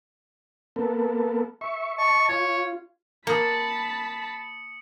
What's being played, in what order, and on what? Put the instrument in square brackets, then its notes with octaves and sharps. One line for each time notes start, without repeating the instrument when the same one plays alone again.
[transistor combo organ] A#3 B3 A4
E5 C#6
[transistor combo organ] D#5 A5 [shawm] C#6
[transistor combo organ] F4 [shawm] C#5
[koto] A#3 [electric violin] A5 B5 [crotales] D#6 C#7